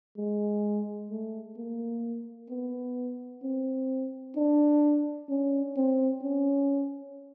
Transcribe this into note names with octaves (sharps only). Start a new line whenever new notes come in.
G#3
A3
A#3
B3
C4
D4
C#4
C4
C#4